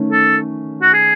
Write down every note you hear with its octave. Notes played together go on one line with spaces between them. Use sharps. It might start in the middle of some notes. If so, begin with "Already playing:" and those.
Already playing: D#3 A3 C#4
A4
F#4
G#4